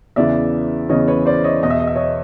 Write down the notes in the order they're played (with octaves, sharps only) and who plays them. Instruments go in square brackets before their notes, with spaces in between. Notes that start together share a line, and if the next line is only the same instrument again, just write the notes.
[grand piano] E2 C#3 E3 D5 E5
E2 C#3 E3 C#5 D#5
B4 C#5
C5 D5
C#5 D#5
E2 B2 D#5
E5
D#5
E5
C#5 D#5